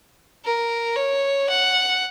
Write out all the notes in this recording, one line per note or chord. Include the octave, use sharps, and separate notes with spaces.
A#4
C#5
F#5